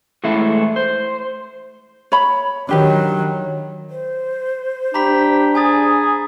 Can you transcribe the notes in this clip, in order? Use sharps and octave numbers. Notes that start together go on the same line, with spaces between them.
A2 E3 G#3 A3 E4
C5
C#5 B5
D#3 F#3 D4 G4 B4
C5
D4 G4 A#5 B5 B6
G#4 G#5 D#6 A6